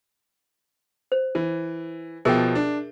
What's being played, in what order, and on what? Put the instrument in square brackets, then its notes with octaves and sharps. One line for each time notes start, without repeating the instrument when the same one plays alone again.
[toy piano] C5
[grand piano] E3
[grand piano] B2 F3 G5 [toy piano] G#4 A#4 E5
[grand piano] D4